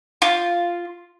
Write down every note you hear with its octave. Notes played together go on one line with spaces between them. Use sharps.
F4